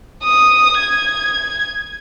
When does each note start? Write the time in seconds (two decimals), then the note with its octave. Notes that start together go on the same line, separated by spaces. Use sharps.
0.23 D#6
0.78 G#6